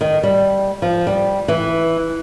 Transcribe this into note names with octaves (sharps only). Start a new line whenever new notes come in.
D#3
G3
F3
G3
E3